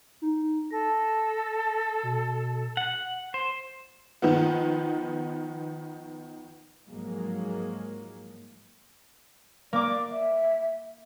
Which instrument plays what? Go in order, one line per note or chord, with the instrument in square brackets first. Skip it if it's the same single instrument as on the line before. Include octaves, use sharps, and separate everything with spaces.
[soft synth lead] D#4
[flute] A4 [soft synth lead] A#6
[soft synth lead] B2
[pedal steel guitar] F#5
C5
[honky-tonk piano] D#3 F3 B3
[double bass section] G#2 F3 F#3 G#3 A#3
[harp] A#3 D6 [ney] D5
[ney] E5